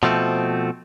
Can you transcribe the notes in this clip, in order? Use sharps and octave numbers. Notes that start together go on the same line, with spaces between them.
B2 F3 A3 C4